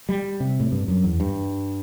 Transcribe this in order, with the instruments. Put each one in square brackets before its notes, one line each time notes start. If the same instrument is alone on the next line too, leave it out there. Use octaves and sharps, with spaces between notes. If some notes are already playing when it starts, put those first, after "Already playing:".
[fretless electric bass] G3
C3
A2
G2
F#2
E2
G2